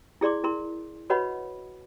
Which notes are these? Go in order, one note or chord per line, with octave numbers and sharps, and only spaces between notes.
E4 G#4 D5 C6 D6
E4 A#4 C6
F#4 B4 C#5 D#5 F#5 B5